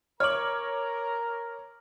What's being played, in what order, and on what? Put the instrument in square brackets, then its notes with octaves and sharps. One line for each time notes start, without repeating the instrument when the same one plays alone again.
[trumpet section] A#4 A#5 [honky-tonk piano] C#5 D6 [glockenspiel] F6 F#7